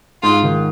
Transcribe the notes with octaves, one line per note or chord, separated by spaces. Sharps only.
G#2 F4
D#3